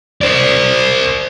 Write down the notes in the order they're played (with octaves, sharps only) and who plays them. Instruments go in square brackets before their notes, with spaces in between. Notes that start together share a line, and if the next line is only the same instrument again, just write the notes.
[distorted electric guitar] C5 D5